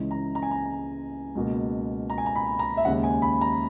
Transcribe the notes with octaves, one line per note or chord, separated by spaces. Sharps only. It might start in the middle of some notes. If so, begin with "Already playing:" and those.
Already playing: C#2 C#3 E3 G#3
A#5
A#5
G#5
A#5
C#2 B2 A#3
A#5
G#5
A#5
B5
A#5
E5
D#2 C#3 G#3 F#5
G#5
B5
A#5